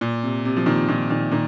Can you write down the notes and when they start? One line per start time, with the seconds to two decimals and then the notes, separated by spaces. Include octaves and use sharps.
0.01 A#2
0.23 C3
0.45 C3
0.56 F3
0.66 A#2 D#3
0.88 A#2 D#3
1.10 A#2 D#3
1.31 A#2 D#3